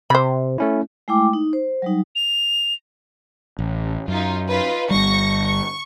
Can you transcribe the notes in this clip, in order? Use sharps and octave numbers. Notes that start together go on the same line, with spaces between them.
C3 C5 B5
A3 C#4 E4
G#3 A3 E4 G5 D6
D#4
C5
F#3 G3 D#4
F7
A1
F#2 D#4 F4
D#4 F4 B4
G1 G3 C#6 A#6 C#7
C#6